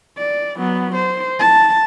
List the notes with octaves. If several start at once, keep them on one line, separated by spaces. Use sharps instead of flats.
D5
F#3 B3
C5
A5